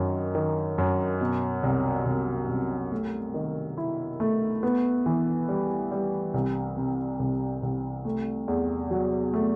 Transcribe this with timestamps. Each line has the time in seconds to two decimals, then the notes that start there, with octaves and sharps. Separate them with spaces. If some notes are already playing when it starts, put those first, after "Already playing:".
Already playing: F#2 D#3
0.35 D#3
0.78 F#2
1.21 B2
1.63 C2
2.06 C2
2.49 C2
2.91 A3
3.34 D#3
3.78 E4
4.20 A3
4.63 B3
5.06 E3
5.48 G3
5.91 G3
6.34 C2
6.77 C3
7.19 C2
7.63 C2
8.05 A3
8.48 E2
8.91 F#3
9.34 A3